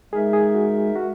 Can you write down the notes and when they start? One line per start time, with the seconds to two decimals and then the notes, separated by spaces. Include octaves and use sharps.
0.13 G#3 D#4 G#4 A#4 E5
0.33 G#4
0.54 F#4
0.96 F#4